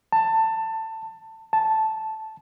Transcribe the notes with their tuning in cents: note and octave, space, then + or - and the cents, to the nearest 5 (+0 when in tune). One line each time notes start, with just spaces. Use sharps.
A5 +20
A5 -5